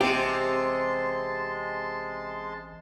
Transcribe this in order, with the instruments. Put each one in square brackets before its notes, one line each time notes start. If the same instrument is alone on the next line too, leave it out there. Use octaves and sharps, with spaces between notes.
[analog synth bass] A1 [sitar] C3 [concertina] G#3 A5 C6 [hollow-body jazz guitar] C4 G4